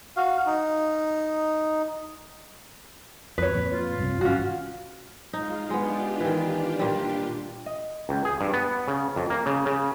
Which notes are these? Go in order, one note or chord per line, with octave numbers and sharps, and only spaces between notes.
F#4 F5
D#4
F2 B4 C#5
F2 A#2
F4
G2 C3
G#1 C#4 F#4 F5
G#3 D#4 F4 F5
G#3 B3 D4 F4 G4
D#3 E3
A#2 G3
D#5
C#2
G#4
G2
B3
C#3
F2
A#3
C#3
C#3